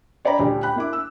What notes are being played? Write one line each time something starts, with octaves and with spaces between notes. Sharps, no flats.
C#5 D5 G5 A#5 B5
D#1 D2 D4 G4
G5 B5 F#6
A#3 E4 D6
E6